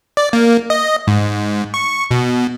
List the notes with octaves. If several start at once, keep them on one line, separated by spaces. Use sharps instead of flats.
D5
A#3
D#5
G#2
C#6
B2